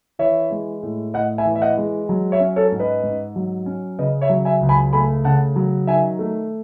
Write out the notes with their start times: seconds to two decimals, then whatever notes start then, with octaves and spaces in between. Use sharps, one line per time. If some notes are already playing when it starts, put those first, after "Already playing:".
0.19 E3 C#5 E5
0.51 G#3
0.83 A2
1.14 A2 D#5 F#5
1.38 E5 G#5
1.45 E3
1.56 E5
1.62 D#5 F#5
1.77 G#3
2.09 F#3
2.32 C#5 E5
2.40 C#4
2.56 A4 C#5
2.72 G#2
2.80 B4 D#5
3.03 G#2
3.36 F#3
3.66 C#4
3.98 C#3 B4 D#5
4.21 C#5 E5
4.29 F#3
4.45 E5 G#5
4.61 C#2
4.69 G#5 B5
4.93 A3 G#5 B5
5.24 C#3 F#5 A5
5.56 F#3
5.87 D#3 E5 G#5
6.19 A3